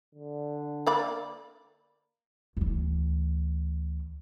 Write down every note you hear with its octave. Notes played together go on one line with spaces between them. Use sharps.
D3
A#3 D5 B5
D2 E3